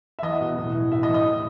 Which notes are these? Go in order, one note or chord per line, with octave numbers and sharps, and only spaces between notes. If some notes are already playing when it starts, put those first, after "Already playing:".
E5
E2 D#5
B2
A2
E3
A2 E5
D#5
E3
D#5
A2